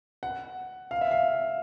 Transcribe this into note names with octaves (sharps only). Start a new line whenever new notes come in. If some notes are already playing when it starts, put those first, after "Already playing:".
F#5
F5
E5
F5